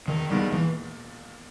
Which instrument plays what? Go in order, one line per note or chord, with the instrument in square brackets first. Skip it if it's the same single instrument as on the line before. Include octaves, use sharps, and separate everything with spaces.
[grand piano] E1 [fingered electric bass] D#3
[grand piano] D#2 D#3 G#3 B3 [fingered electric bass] G3
[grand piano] A#2 [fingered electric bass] E3